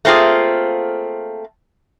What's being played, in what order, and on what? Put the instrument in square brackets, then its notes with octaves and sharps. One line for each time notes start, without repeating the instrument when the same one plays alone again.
[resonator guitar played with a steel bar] A3 A#3 C4 F4 G#4